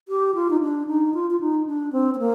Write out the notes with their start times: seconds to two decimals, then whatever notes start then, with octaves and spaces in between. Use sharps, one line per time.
0.09 G4
0.35 F4
0.50 D#4
0.61 D4
0.87 D#4
1.14 F4
1.31 F4
1.41 D#4
1.66 D4
1.93 C4
2.14 C4
2.19 A#3